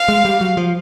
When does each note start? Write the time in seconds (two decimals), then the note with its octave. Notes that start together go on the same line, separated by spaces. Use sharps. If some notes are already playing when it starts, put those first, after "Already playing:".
Already playing: F5
0.08 G#3
0.25 G3
0.41 F#3
0.57 F3